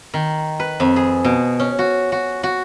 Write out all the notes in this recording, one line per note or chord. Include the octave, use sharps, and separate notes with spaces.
D#3
B4
F2
G#4
B2
C#4
F#4
F#4
F#4